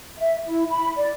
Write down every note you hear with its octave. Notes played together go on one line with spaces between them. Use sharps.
E5
E4
B5
D5